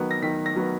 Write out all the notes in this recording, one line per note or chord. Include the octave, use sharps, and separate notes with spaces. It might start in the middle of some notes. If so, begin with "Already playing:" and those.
Already playing: D#3 F#3 B3
A#6
D#3 B6
A#6
F#3 B3